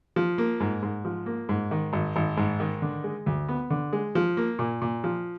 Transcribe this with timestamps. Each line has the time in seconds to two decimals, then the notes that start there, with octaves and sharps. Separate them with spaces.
0.16 F3
0.38 A#3
0.60 G#2
0.83 G#2
1.05 F3
1.26 A#3
1.49 G#2
1.71 D#3
1.93 G#1
2.16 G#1
2.37 G#2
2.60 D#3
2.82 D3
3.04 G#3
3.26 D2
3.48 B3
3.70 D3
3.93 G#3
4.15 F3
4.37 A#3
4.59 A#2
4.82 A#2
5.04 F3